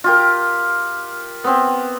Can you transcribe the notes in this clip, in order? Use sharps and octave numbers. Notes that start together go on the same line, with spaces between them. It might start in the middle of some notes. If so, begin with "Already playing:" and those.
F4 G4 A#4
B3 C4